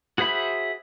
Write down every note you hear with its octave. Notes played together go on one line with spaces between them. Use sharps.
F#4 G#4 C5 E5 B5